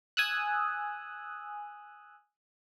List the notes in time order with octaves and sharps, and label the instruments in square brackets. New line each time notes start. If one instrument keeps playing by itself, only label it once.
[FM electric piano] G#5 D#6 E6 F#6